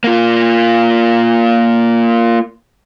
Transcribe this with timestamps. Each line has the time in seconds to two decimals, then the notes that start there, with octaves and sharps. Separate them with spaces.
0.04 A#3 F4